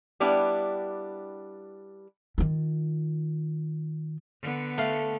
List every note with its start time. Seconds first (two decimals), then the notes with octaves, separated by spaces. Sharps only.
0.20 G3 B3 D4 E4 G4
2.38 D#3 F4
4.42 D3 B3
4.78 A3 F5